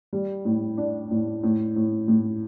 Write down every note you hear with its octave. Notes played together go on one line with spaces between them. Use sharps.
G3
A2
D4
A2
A2
A2
A2